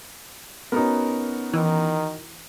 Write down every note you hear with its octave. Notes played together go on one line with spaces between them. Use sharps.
B3 C#4 D#4 F#4 A#4
D#3 E3